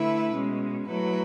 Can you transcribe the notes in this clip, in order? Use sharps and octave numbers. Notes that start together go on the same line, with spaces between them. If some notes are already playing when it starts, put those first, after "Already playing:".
Already playing: D3 A3 E4 B4 E5
B2 G#3 C#4
F#3 A3 E4 B4